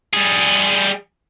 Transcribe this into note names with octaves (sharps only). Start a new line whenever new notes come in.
G3 G#4